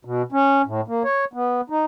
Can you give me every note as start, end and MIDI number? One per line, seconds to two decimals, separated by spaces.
0.05 0.22 47
0.32 0.62 61
0.66 0.81 45
0.88 1.03 58
1.04 1.25 73
1.33 1.61 59
1.70 1.85 63